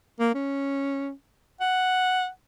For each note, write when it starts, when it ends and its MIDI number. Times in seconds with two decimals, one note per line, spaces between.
0.20 0.31 58
0.35 1.10 61
1.61 2.28 78